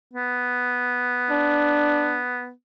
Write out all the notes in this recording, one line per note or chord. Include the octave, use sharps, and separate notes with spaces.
B3
D4